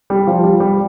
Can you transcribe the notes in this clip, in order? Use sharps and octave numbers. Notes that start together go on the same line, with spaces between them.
G3
F3
G3
G3